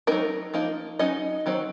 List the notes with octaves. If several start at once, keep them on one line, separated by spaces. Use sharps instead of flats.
F#3 A#3 C4 D#4 A#4
F3 A#3 D#4
F#3 C#4 D#4 D#5
D#3 F#3 C4